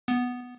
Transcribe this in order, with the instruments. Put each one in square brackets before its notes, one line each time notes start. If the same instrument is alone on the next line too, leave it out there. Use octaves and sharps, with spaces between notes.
[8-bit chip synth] B3